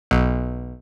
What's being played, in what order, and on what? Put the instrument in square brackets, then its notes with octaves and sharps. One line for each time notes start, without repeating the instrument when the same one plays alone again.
[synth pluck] B1